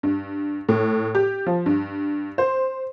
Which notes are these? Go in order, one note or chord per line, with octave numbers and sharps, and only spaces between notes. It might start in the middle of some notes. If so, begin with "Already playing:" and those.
G2
A2
G4
F3
G2
C5